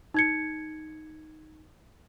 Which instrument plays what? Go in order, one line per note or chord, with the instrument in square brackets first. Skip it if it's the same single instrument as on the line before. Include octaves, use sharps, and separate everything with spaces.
[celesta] D#4 G#6 C#7